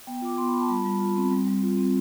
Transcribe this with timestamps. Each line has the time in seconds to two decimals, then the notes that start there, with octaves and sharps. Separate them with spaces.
0.07 B3 G5
0.22 F4 D6
0.37 B3 C6
0.48 B5
0.53 F4
0.61 A5
0.68 G3 B5
0.85 G3
1.00 F4
1.16 C4
1.31 G3
1.47 G3
1.63 F4
1.77 C4